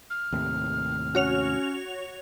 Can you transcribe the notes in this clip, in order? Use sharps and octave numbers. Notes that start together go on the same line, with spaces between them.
F6
D#2 A2 C3
C#4 F#4 C#5 F7